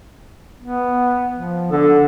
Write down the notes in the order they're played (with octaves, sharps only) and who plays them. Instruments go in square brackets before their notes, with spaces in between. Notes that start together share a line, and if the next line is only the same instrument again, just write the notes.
[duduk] B3
F3
[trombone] D3 [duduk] A4